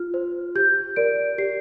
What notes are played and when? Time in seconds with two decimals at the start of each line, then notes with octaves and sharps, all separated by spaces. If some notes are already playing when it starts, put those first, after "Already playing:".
Already playing: F4 F6
0.14 C5
0.55 G4 G6
0.96 A#4 D5 D7
1.38 G4 C7